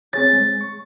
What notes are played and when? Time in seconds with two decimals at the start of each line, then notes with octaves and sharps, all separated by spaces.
0.13 C4 G#4 C#5 A6
0.33 G#3
0.61 C#6